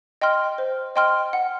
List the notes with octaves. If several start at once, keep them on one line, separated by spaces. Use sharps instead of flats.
D#5 G5 C6 F6
C5
D#5 G5 C6 F6
F#5